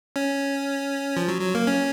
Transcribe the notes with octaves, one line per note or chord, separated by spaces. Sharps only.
C#4
F3
F#3
F#3
A#3
C#4